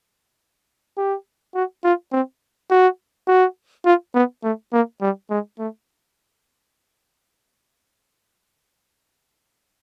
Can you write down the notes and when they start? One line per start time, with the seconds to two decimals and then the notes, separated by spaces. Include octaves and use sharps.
0.98 G4
1.55 F#4
1.84 F4
2.12 C4
2.71 F#4
3.28 F#4
3.85 F4
4.15 B3
4.43 A3
4.72 A#3
5.02 G3
5.30 G#3
5.59 A3